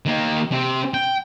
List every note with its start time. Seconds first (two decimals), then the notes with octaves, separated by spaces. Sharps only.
0.06 D#3 A#3
0.52 C3 C4
0.94 G5